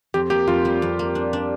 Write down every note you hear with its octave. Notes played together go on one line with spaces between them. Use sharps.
F2 G4
A#3 G4
F2 F4
G3
F2
A#3
D4
D4